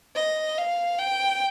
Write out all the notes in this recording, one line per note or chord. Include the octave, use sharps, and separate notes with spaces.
D#5
F5
G5